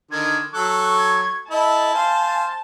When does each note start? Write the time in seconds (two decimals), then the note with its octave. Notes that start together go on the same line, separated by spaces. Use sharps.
0.11 D3 D#3 G#6
0.53 F#3 A4 C#6 F#6
0.98 G#6
1.51 E4 A4 D#5 A5
1.94 C5 F5 G#5